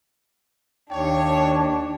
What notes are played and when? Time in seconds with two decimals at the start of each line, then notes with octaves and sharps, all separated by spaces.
0.91 D#2 D4 C#5 G5